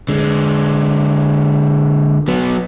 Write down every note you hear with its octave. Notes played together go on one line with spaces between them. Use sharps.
D3 G#3
F#3 B3